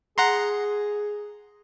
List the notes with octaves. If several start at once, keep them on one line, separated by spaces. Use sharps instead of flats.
G#4 F#5 A#5 C6